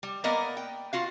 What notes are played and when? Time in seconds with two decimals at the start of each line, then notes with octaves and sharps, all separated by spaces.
0.03 G3
0.24 A#3 B3 A#4 D5 D#5
0.57 G5
0.93 F4 F#4 F5